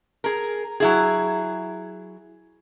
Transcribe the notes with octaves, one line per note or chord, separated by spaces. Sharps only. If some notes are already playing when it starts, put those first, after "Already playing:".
G#4 A#4
F#3 E4 G#4